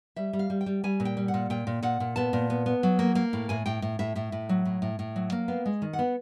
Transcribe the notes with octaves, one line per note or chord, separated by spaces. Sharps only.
G3 E5
G3
F5
G3
G5
G3
G3 G#5
A#2
G5
G3
F#5
A#2
A#2 G5
A#2
A#2 F#5
A#2
B3 A5
A#2
B3
B3
F#3
A#3
A#3
A2
A2 G#5
A2 G5
A2
A2 E5
A2 E5
A2
F#3
A2
A2
A2
F#3
A#3
B3 F5
G#3
D#3
F#5
B3